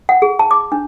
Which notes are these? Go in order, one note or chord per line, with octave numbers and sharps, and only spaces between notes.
F#5
G#4
A5
D6
D4